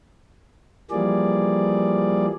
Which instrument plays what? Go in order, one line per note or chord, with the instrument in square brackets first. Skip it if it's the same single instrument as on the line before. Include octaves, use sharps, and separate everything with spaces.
[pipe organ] E3 F3 G3 A#3 G#4 D5